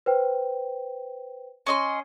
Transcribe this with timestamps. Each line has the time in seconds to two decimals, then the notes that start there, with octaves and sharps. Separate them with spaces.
0.06 B4 C5 G5
1.67 C#4 D#5 C6